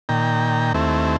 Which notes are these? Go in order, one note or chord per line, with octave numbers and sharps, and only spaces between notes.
A#2 D#3 G5 A#5
D#2 A3 C4 E4